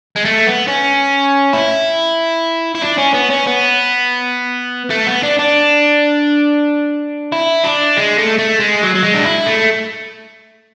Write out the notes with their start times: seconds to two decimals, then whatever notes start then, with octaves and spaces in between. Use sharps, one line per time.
0.16 G#3
0.25 A3
0.47 B3
0.68 C#4
1.53 E4
2.75 E4
2.81 D4
2.98 C#4
3.14 B3
3.30 C#4
3.47 B3
4.90 A3
5.07 B3
5.23 D4
5.39 D4
7.32 E4
7.64 D4
7.97 G#3
8.18 A3
8.39 A3
8.60 G#3
8.83 F#3
8.95 F#3
9.03 G#3
9.14 D4
9.25 E4
9.46 A3